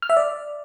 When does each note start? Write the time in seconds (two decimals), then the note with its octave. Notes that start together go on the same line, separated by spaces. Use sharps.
0.02 F6
0.10 E5
0.17 D5